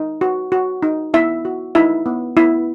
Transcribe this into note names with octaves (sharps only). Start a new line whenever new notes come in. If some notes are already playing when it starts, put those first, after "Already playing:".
Already playing: D#4
F#4
F#4
D#4
B3 E4 E5
F#4
D#4 E4 E5
B3
B3 E4 E5